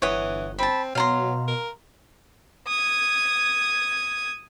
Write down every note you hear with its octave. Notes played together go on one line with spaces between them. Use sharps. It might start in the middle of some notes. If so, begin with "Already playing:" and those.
G1 E3 C#5 D#5 F#5
C4 A5 B5
B2 F#3 F5 A#5 C6
A#4
D#6 G#6